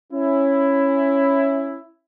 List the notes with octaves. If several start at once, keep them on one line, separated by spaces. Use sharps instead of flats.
C#4 E4